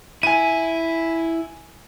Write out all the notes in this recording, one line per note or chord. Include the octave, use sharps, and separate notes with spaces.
E4 G#5 D#7